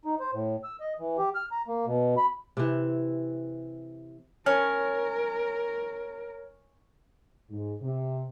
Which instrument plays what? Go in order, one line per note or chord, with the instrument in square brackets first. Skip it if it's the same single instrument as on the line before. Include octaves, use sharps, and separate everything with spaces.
[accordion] D#4
C5
A2
E6
D#5
E3
G4
F6
A#5
A#3
B2
B5
[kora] C3 E3
[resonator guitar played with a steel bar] C#4 [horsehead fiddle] A#4 [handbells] C#5 F6
[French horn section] G#2
C3